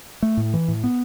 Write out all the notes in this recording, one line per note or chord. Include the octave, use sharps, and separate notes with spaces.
A3
A2
E3
A2
B3